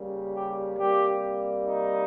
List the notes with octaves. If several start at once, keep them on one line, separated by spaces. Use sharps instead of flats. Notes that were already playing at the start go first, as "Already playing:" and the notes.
Already playing: C#3 G3 A#3
G4
C3 G3 A#3 G4
D#4